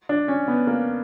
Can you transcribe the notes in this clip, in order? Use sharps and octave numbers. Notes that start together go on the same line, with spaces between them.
D4
C#4
B3
A#3